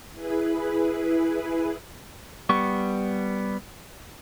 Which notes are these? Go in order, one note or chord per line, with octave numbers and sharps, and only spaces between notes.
E4 G#4 B4
G3 B3 C#6